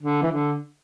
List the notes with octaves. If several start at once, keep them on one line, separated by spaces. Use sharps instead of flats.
D3
E3
D3